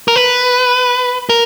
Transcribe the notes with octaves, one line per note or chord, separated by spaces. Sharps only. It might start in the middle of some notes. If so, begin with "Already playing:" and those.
A#4
B4
A#4